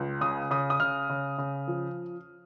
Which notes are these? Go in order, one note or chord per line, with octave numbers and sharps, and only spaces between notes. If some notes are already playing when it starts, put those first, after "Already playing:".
Already playing: C#2
C#3 D#6
C#3 D#6
D#6
C#3 F6
C#3
C#3
F3